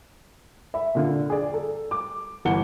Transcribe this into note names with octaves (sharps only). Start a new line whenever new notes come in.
E5 B5
A#2 D3 F4
G#4 D5
A4
D6
G1 E3 F#5 C#7 G7